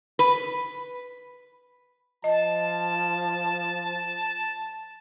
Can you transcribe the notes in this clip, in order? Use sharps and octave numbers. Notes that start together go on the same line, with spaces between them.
B4
F3 D#5 A5